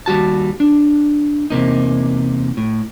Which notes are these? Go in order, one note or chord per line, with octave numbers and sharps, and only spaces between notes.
D#2 G3 F#4 A5
D4
E2 C3 A#3 D#4
A2